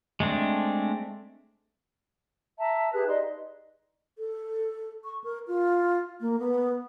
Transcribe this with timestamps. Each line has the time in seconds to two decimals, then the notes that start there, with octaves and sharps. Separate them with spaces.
0.20 G#3 A3 C4 D4
2.58 E5 A5 A#5
2.93 G4 G#4 B4 F#6
3.08 D#4 D5 D#5 C6
4.18 A4
5.04 C#6
5.24 A#4
5.48 F4
6.21 A#3
6.40 B3